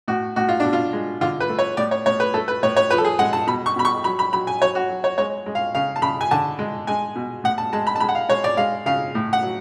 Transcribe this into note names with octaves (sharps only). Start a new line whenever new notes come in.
A2 F#4
A2 F#4
F4
B2 D4
F4
G#3
D3 F4
B4
A3
C#5
A2 D5
C#5
A2 C#5
B4
A3 A4
B4
A2 C#5
C#5
F3 B4
A4
G#4
G#3 F#5
A5
B2 B5
C#6
B2 B5
C#6
F#3 B5
B5
F#3 B5
G#5
F#3 C#5
F#4
F#3
C#5
G#3 C#5
G#3
F5
C#3 F5
A5
C#3 B5
G#5
D3 A5
G#3
G#3 G#5
B2
A2 F#5
A5
G#3 A5
B5
A5
G#3 B5
F#5
F5
G#3 C#5
D5
G#3 F5
C#3 F5
A2
F#5
F#3